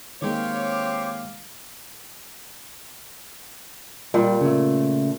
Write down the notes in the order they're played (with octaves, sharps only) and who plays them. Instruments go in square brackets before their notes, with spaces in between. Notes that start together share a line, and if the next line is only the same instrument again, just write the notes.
[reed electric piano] D#3 G#3 A#3 [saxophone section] C4 G4 C#5 [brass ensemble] F5 [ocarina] D6
[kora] A#2 [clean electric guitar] G3
[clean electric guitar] C#3 A3